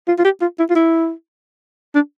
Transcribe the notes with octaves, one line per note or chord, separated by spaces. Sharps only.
F4
F4
G4
F4
E4
F4
E4
D4